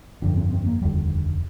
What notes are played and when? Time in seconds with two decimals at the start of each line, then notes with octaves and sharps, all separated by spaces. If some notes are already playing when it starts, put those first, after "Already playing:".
0.22 G1 F2 D3 D4
0.37 C4
0.52 C4
0.66 A#3
0.81 F1 D#2 D3 G3